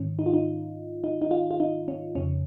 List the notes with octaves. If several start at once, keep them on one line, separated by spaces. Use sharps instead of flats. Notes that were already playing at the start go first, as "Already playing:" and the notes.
Already playing: G#2 D#3 C#4
D#4
F4
D#4
D#4
D#4
F4
F4
D#4
C#4
F2 C#3 C#4